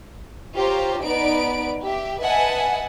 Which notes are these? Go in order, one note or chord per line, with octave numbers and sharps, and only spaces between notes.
F4 G4 C5 C#5 A#5
B3 D#4 D5 B5 D7
G4 E5
B4 D#5 E5 F#5 G#5 A5